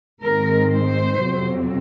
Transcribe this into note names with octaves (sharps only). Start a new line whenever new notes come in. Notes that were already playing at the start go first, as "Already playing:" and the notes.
G#2 D#3 G#3 C4 A#4
C5
F2 C3 F#3 C4